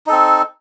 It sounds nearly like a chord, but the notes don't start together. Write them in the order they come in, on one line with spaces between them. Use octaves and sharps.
D#4 A4 C4